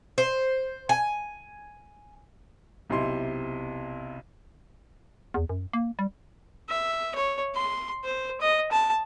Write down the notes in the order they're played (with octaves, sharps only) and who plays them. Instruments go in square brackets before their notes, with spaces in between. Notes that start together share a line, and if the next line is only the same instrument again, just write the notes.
[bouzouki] C5
G#5
[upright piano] B1 C3 E4 C6
[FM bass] E2
F#2
A#3
G3
[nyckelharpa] E5
C#5
C6
C5
D#5
A5